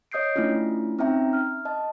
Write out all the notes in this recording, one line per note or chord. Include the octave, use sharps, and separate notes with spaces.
C#5 D#5 D#6 G6 C7 D7
A3 C#4 D4 E4 F4
C4 C#4 D#4 E5 G5 A#5
F6
D#5 A5